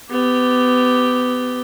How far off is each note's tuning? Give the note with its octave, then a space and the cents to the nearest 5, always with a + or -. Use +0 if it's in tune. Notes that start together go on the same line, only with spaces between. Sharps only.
B3 +25 G4 +0